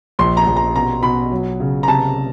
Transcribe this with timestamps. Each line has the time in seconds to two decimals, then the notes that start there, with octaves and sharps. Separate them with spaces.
0.19 A#1 C6
0.37 A#5
0.47 A#1
0.56 A#5
0.75 B2 A#5
1.03 B2 B5
1.32 F#3
1.60 C#3
1.83 A#5
1.88 C3 A5